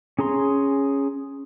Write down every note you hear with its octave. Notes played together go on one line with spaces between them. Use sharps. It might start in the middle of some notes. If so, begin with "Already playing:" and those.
C#4 G#4 A#5 C6